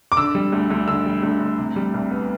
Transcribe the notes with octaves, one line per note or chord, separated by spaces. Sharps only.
D6
D3 E6
G3
D2
D2
D3 E6
G3
D2
D2
C3
G3
C2
B3